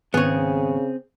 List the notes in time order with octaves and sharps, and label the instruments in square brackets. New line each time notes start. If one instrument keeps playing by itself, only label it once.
[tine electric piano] G#1 [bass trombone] C#3 [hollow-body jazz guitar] B3 C#5 [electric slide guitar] C4 G#4